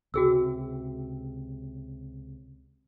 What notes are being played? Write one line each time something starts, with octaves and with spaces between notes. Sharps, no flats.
C#2 C3 F#4 G#4 E6